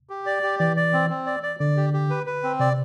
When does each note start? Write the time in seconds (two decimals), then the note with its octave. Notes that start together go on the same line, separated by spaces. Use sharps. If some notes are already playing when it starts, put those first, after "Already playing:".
0.09 G4
0.26 D5
0.43 G4
0.59 E3 D5
0.76 D5
0.93 C4
1.10 C4
1.26 D5
1.43 D5
1.60 D3 D5
1.77 G4
1.94 G4
2.10 B4
2.26 B4
2.43 C4
2.60 C3 D5